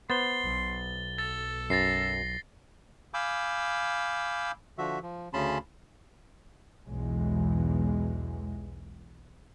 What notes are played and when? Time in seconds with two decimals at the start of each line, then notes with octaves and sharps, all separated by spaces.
0.10 B3 C5 C6 A6 G7
0.44 B1
1.18 A4 A6
1.70 F#2 A6 A#6 C7
3.14 F5 G#5 B5 D6 E6 G6
4.78 D3 F3 F#4 E5
5.03 F3
5.33 D2 C#3 C#4 A5 B5 C6
6.86 B1 E2 G#3